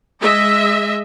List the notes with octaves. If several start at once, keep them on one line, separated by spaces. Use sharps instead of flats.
G#3 D#5 E5